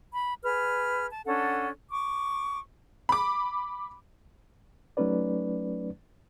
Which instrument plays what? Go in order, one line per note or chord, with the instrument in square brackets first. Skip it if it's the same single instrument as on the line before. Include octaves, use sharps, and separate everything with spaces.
[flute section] B5
G#4 B4 F6
A5
C#4 D4 A4 F#5
C#6 D6
[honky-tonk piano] B5 D6
[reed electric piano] F#3 A3 C#4 D#4 B4 D5